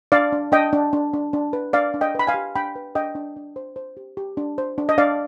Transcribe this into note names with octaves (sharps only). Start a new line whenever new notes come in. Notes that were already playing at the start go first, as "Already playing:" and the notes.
D4 D5 F5
D4
D4 D#5 G5
D4
D4
D4
D4
B4
D4 D5 F5
D4
D#5 G5
B4 B5
F5 G#5
G4
D4 G5 B5
B4
D4 D#5 G5
D4
D4
C5
C5
G4
G4
D4
C5
D4
D#5
D4 D5 F5